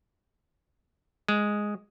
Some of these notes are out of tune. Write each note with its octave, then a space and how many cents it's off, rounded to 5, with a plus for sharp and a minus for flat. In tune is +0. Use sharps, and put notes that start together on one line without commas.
G#3 +0